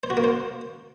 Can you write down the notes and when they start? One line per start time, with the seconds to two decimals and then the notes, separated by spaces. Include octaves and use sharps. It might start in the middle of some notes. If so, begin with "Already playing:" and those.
0.03 C5
0.10 F#4
0.17 A#3
0.24 C5